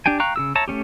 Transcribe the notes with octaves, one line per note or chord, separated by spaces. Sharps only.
D4 G4 G5 G#5
F5 G5 A#5 C#6 F#6
C#3 G4 E6
C#5 E5 A5 A#5
A3 B3 C#4 G4